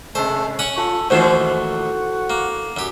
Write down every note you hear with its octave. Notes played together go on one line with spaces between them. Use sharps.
C3 G#3 A3 C5
C#4 C#5 F#5 C#6
F4 A4
A#1 D#2 E3 A3 F#4 A4 C5
A#3
F#2 G4